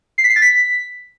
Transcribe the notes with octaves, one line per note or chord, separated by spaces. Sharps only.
C7
B6
C7
A6
B6